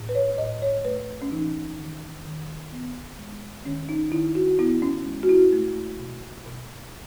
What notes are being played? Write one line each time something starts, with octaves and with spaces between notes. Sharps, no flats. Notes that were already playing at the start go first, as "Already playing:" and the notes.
Already playing: A2
B4
C#5
A2 D#5
C#5
A3 B4
C#4
E3 D#4
D#3
D#3
B3
G#3
D#3 C#4
D#4
D#3 E4
F#4
B3 E4
C#4
G#3
F#4
E4
A3
B2
B2